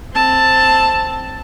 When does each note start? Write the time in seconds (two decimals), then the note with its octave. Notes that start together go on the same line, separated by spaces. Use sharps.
0.14 C4 A5